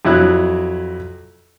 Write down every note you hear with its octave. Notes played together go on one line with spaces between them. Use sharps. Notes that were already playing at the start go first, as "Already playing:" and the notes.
F2 F#3 E4 F#6